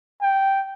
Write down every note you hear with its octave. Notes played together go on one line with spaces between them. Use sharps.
G5